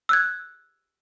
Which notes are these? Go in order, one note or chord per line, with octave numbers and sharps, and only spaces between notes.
E6 F#6 G#6